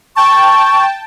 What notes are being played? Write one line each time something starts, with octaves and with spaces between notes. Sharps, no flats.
G5 A5 C#6